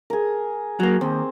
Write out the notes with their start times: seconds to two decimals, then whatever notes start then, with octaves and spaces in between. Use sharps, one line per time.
0.10 G#4 A#4
0.80 F#3 A#3
1.01 D#2 C4